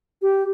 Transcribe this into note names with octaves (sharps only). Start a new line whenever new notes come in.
G4